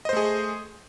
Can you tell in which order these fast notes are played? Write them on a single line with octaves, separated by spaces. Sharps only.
D#5 C5 A3 G#4